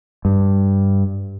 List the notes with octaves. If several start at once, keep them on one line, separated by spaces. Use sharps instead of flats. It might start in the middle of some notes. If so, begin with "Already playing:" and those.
G2